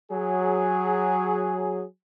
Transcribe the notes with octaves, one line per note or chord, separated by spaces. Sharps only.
F#3 G#4